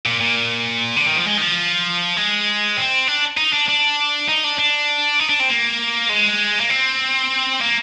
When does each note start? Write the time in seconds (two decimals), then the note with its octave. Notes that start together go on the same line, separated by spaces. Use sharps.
0.06 A#2
0.21 A#2
0.96 D3
1.07 D#3
1.16 F3
1.27 G#3
1.38 D#3
1.41 F3
2.17 G#3
2.77 C4
3.08 D4
3.37 D#4
3.53 D4
3.68 D4
4.28 D#4
4.44 D4
4.59 D4
5.20 D#4
5.29 D4
5.40 C4
5.49 A#3
6.10 G#3
6.61 A#3
6.70 C4
7.61 A#3